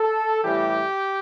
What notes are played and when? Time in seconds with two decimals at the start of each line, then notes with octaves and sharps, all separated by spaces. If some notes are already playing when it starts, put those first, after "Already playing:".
Already playing: A4
0.43 A1 A2 E3 G3 G4